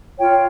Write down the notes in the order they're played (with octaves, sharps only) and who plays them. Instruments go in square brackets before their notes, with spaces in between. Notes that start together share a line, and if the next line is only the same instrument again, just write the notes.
[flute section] F4 C#5 G5